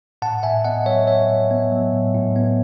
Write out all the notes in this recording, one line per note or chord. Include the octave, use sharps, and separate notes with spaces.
A2 F#5 A5
A2 E5 G#5
B3 D#5 F#5
F#3 C#5 E5
A2 C#5 E5
A2
B3
F#3
A2
A2
B3